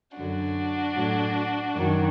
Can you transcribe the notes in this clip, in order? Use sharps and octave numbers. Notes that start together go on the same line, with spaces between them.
F#2 D3 F#3 D4 F#4
A2 F#3
F#2 D#3 F#3